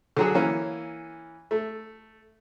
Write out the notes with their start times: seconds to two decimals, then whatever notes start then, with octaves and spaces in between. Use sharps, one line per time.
0.17 D3 F#3 G#4
0.34 E3 A#3 C#4
1.51 A3